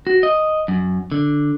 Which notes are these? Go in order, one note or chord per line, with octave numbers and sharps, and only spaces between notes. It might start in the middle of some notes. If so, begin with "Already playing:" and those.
F#4
D#5
F#2
D3